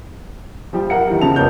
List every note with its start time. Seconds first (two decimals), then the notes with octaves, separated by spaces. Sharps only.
0.73 F3 G3 G4
0.90 A#4 F#5 C#7
1.08 D#3 E3 G3
1.21 C#3 F3 A5 F7
1.36 F2 B3 A#4 C#5 G6